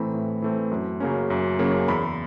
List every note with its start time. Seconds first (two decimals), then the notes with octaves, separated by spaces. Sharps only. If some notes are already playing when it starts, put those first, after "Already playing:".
Already playing: A2 E3 A3 C4 A#5 B5
0.14 A2
0.42 E3 A3 C4
0.71 F#2
1.00 C#3 F#3 A#3 C#4
1.30 F#2
1.59 C#3 F#3 A#3 C#4
1.88 E2 B5